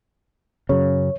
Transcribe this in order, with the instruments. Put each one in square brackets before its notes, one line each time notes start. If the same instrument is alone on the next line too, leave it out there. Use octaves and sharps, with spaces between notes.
[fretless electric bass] F#2 C#3 [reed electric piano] C#5